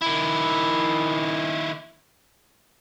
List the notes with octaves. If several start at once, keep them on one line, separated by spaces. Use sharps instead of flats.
D#3 E4